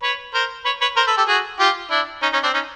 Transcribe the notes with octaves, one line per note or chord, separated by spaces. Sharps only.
B4 C#5
A#4 C5
B4 C#5
B4 C#5
A#4 C5
A4 B4
G4 A4
F#4 G#4
F4 G4
D4 E4
C#4 D#4
C#4 D#4
C4 D4
C#4 D#4